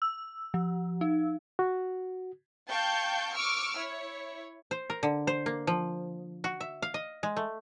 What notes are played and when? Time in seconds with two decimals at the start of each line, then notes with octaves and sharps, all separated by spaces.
0.02 E6
0.54 F3
1.01 D#4
1.59 F#4
2.68 F5 G5 A5 C#6 G6
3.34 C#6 D6 E6 F6 D7
3.76 E4 C#5
4.71 C5
4.90 A#4
5.03 D3
5.27 C5
5.46 A#3
5.67 F3
6.44 F#4
6.60 E5
6.82 F5
6.94 D#5
7.23 G#3
7.37 A3